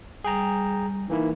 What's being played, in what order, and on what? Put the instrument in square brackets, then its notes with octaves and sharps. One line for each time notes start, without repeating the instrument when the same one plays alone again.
[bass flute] G3 [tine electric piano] G#4 G5 A#5
[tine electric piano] E3 A#3 E4 [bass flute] D#4